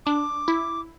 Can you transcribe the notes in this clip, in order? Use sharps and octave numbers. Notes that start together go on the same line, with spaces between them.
D4 D6
E4